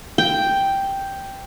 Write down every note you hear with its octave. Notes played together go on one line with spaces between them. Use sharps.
G5